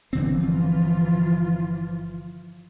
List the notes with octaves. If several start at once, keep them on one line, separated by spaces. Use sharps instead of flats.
G1 D3 E3 F3 C4 F4